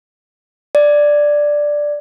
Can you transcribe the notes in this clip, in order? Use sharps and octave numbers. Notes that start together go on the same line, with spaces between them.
D5